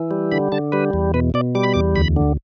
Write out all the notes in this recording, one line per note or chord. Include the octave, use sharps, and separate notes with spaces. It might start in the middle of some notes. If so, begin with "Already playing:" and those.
Already playing: E3
G3
D3 B5
D3 A5
G3 B4
E2
B2 B4
B2 D5
G3 D6
B5
E2 D6
D2 B5
D3